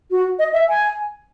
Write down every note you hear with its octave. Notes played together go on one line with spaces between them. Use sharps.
F#4
D#5
E5
G#5